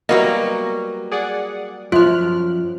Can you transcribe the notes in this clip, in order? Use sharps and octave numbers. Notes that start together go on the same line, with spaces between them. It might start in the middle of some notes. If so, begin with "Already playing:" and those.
F#3 G3 A#3 B3 F#4 D#5 A#5
G#4 D5 F#5
F#2 F3 F4 F6 F#6